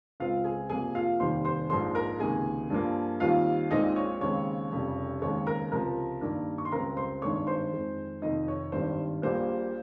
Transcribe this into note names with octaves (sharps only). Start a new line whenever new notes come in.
C#2 C#3 G#3 C4 F4 F5
G#4 G#5
C2 C3 F3 A#3 G#4 G#5
F4 F5
F1 D#2 D#3 G3 C5 C6
C5 C6
A#1 G#2 F3 G#3 C5 C6
A#4 A#5
C#2 C3 D#3 A#3 G#4 G#5
G2 F3 A#3
D#2 D#3 G3 C4 F4 F5
A#1 A#2 G#3 C4 D#4 D#5
C#5
D#2 C#3 G#3 C4 C#5
F1 F2 C#3 G3
D#2 C#3 G#3 C4 C#5
A#4 A#5
C#2 C3 F3 A#4 A#5
G2 D#3 A#3
C#6
C6
C#2 C#3 G3 C4 A#4 A#5
C5 C6
G#1 G2 D#3 G#3 C#5 C#6
C5 C6
F2 D#3 G#3
F1 F2 D#3 D#4 D#5
C#5
G#1 G2 D#3 G3 C5
A#1 A#2 G3 A#3 C5